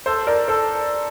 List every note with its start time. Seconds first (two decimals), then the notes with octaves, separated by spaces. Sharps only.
0.06 A4 C5
0.27 A#4 D5
0.48 A4 C5